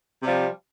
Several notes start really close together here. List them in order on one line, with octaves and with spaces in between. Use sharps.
C3 G3 F3